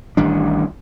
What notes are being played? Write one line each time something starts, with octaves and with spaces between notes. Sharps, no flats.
A1 D#3 G3 D4